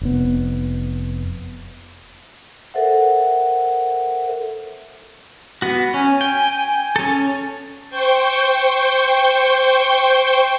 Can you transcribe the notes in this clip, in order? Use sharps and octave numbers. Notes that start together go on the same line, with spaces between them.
F1 B3
A4 A#4 C5 E5 F#5
B3 F#4
C#4 G#5
G5
C#4 A4
C5 G5 C#6 G6